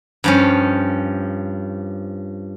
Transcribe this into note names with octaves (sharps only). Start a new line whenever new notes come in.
G2 F3 C#4